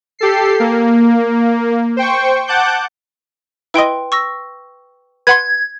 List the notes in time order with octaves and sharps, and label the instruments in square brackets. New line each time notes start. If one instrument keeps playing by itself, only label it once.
[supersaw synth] G4 A4 C7
A#3
C5 G5 C#6
F#5 A5 D6 F#6 G6
[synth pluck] E4 D#5 [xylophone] B4 G5 C6
[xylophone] C#6 E6 A#6
[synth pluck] B4 F#5 C6 [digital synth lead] G#6